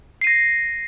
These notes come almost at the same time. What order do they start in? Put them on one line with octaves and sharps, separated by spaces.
C7 D#7 A#6